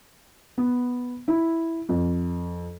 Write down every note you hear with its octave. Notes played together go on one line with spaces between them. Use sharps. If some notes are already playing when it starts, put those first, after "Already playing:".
B3
E4
F2